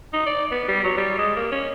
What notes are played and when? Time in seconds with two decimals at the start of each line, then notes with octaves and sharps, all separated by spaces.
0.13 D#4
0.26 D5
0.51 B3
0.68 G3
0.84 F#3
0.97 G3
1.18 G#3
1.36 A#3
1.52 C#4